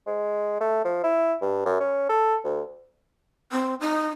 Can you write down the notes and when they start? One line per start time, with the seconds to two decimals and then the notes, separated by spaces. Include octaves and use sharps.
0.07 G#3
0.60 A3
0.84 F3
1.03 E4
1.42 G2
1.65 F#2
1.80 C#4
2.09 A4
2.44 D2
3.52 C4
3.81 D#4